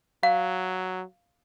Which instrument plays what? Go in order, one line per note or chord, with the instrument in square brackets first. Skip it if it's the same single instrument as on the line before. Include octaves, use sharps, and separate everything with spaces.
[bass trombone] F#3 [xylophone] F5